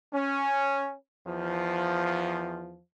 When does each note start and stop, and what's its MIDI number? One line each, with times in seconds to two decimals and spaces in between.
0.14 0.94 61
1.27 2.79 40
1.27 2.79 53